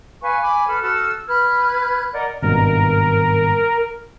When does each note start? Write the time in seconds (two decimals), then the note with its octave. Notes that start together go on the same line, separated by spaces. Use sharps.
0.21 B4 F5 G#5 C#6
0.42 G#5 B5 D6
0.67 A4 B4 B5 F6
0.81 F#4 A4 E6 F6
1.27 B4 F6 F#6 G#6
2.13 A#4 D5 D#5 F#5
2.43 G#1 G2 B2 A#4